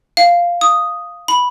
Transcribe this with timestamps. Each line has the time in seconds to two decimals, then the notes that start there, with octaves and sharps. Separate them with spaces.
0.17 F5
0.61 D#6
1.28 B5